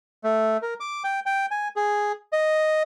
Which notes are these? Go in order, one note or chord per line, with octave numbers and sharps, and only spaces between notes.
A3
A#4
D6
G5
G5
G#5
G#4
D#5